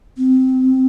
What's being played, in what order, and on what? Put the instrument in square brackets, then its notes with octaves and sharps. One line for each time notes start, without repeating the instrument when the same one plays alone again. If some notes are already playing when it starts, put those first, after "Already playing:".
[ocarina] C4